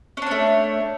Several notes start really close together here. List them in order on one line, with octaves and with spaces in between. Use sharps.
C#4 D4 C#5 A3